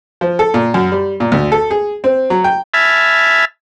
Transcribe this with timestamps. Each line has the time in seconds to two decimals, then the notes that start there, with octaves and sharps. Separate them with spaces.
0.21 F3
0.39 A4
0.54 A#2
0.74 F#2
0.92 G3
1.20 A#2
1.32 D2
1.52 A4
1.71 G#4
2.04 C4
2.30 F#3
2.44 G5
2.74 E5 G#5 A5 B5 F6